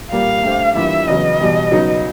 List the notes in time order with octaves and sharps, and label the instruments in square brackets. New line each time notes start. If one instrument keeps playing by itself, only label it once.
[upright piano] A#2 G3 A#3 [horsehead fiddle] F5
[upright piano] A3 D4 G4 C5
[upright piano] E3 G3 A#3 D4 F4 [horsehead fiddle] E5
[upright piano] E2 C#3 F#3 B3 [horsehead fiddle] D#5
[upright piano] E2 B2 G3
C#3 F#3 B3 D#4